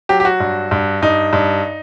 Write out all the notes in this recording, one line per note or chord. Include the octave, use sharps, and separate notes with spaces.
F#3 G4
G4
F#4
G2
G2
G2 D#4
G2